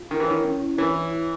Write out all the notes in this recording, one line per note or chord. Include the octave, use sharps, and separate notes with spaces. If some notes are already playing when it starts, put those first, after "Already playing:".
Already playing: F4
D#3 E4
E3
D#3 C#5
C#4
E4
E3 C#5
C#5
E4